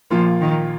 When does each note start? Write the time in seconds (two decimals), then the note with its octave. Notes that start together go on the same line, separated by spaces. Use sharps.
0.10 A#1 A#2 F3 A#3 F4
0.41 D#3